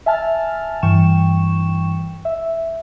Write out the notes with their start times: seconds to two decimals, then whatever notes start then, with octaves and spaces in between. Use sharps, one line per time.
0.06 E5 G#5 A5 F6 A6
0.83 G2 E3 G5 C#6 E7
2.25 E5